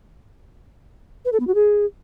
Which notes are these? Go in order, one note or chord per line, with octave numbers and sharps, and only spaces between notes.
B4
A4
B3
F#4
G#4